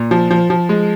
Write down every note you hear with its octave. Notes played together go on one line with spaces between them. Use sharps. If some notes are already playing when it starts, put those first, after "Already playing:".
Already playing: A#2
F3
F3
F3
G#3